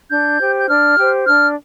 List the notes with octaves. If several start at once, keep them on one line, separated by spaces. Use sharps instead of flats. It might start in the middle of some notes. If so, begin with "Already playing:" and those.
D4 G6
G4 C5
G6
D4 F6
G4 C5
D4 F6